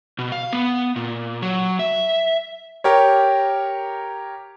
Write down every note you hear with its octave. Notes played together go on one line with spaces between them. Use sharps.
B2
F5
B3
A#2
F#3
E5
G4 A#4 C#5